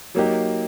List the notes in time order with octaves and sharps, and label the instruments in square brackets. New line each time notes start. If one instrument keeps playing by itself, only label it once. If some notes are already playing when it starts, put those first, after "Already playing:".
[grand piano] F#3 A#3 D#4 G4